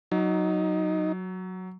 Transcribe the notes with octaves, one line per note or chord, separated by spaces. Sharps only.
F#3 D#4